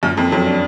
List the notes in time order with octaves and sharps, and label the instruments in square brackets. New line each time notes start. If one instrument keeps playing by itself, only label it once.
[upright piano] F#2 [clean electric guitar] A#2
[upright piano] F2 [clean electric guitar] A#2
[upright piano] F2 [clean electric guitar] F#3
[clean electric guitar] D4